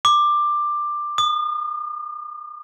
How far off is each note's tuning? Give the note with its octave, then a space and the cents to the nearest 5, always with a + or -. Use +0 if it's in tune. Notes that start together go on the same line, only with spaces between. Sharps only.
D6 +15
D#6 -40